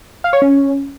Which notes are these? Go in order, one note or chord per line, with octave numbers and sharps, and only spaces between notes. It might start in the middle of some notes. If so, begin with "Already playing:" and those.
F5
C#5
C#4